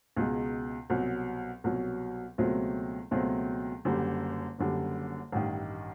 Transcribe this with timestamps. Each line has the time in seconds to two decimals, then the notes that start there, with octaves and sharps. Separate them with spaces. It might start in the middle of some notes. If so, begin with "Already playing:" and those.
0.17 C#2 B2 G#3
0.90 C2 B2 F#3
1.64 C2 B2 F#3
2.38 C#2 B2 F#3 A3 C4
3.11 C#2 B2 F#3 A3 C4
3.85 F#1 F#2 D3 G3
4.59 F#1 F#2 D3 G3
5.32 A1 G2 D#3